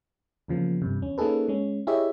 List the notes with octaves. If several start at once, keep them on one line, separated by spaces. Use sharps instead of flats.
E2 C#3 F3 A#3
E2 G2 C3
E2 C#4
A#3 C#4 D#4 G#4 A4 B4
G#3 C#4
E4 G4 G#4 C#5 D#5 E5